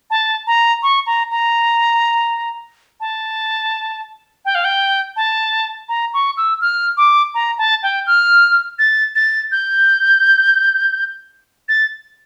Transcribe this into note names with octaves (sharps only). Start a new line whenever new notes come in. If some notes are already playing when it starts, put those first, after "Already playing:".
A5
A#5
C#6
A#5
A#5
A5
G5
F5
G5
A5
A#5
C#6
E6
F6
D6
A#5
A5
G5
F6
A6
A6
G6
A6